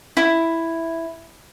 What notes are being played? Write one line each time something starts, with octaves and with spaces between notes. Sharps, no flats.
E4